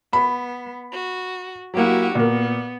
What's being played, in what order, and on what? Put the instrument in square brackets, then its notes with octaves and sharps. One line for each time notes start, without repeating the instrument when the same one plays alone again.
[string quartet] B3 [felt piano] B5
[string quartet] F#4
[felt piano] F#3 A#3 [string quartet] E4 F#4 G4
[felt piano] A#2 A#4 [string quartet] B3